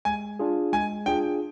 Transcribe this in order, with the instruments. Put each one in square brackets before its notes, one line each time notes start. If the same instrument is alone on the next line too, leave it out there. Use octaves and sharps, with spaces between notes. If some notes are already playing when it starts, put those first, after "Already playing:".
[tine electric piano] G#3 [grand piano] G#5
[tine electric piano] D4 F4 G#4
[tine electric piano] G#3 [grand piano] G#5
[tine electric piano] D4 F4 G#4 [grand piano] G5